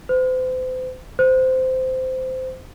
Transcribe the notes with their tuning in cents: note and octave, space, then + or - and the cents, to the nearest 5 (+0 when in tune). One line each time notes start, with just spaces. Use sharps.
C5 -40
C5 -15